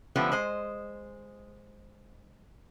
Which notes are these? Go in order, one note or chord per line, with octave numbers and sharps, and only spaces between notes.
D3 F3 G3 A3 B3 C#4
G#3 C5 D#5